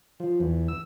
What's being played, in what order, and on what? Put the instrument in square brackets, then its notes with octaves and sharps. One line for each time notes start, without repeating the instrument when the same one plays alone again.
[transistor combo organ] F3
E2
E6